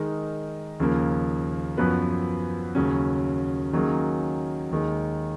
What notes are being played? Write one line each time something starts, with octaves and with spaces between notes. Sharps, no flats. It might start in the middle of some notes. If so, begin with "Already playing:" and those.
Already playing: D#3 G#3 D#4 A#4
D#2 C#3 F3 A#3
F#2 F3 B3 F#4 B4
D#2 C#3 F#3 C#4
D#3 F#3 A#3 C#4 G#4
D#2 D#3 G#3